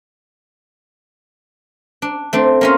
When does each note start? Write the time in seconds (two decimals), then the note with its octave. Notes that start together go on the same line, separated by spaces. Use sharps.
2.02 D4
2.33 A3 C4 D4
2.61 A#3 C#4 F4